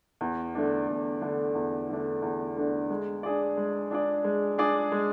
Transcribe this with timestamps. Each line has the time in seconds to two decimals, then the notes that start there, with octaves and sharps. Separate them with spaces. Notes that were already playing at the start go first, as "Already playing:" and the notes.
0.21 E2
0.55 D3 A3 D4
0.88 E2
1.21 D3 A3 D4
1.55 E2
1.89 D3 A3 D4
2.22 E2
2.56 D3 A3 D4
2.90 G#3
3.23 D4 G#4 D5
3.57 G#3
3.91 D4 G#4 D5
4.24 G#3
4.58 D4 G#4 D5
4.92 G#3